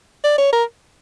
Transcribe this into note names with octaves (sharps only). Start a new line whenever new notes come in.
D5
C#5
A#4